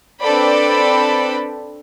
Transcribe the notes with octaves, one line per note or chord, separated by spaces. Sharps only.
C4 D4 A4 B4 D5 B5